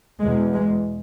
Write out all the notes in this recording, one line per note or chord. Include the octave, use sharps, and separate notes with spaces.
E2 B2 G#3
G#3